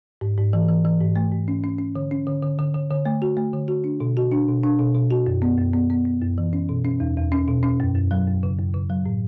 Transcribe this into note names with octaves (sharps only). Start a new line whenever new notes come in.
G#2
G#2
E3
E3
E3
G#2
A3
G#2
C#4
C#4
C#4
D3
C#4
D3
D3
D3
D3
D3
A3
F#4
A3
D3
F#4
D4
B2
F#4
D4
B2
D4
B2
B2
F#4
F#2
B3
F#2
B3
B3
B3
F#2
E3
C#4
B2
C#4
E2
E2
C#4
B2
C#4
F#2
F#2
F#3
F#2
C#3
F#2
C#3
F#3
A2